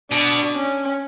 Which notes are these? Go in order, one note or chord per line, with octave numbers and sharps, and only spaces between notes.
B2 D4
C#4